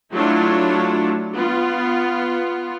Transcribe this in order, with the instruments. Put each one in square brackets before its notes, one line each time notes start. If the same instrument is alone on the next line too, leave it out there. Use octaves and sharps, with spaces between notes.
[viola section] F#3 A3 D4 E4 F4 C#5
B3 F4